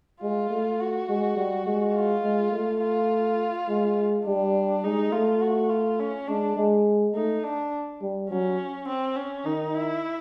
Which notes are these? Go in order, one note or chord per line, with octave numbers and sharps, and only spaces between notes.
G#3 F4
A3
F#4
G#3
G3
G#3
F4
G#3
A3
F4
G#3
G3 D4
G#3 D#4
A3 F4
F#4
F4
C#4
G#3 D4
G#3
A3 D#4
D4
G3
F#3 C#4
C4
C#4
D#3 D#4
E4